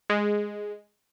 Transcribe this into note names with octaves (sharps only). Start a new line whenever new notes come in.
G#3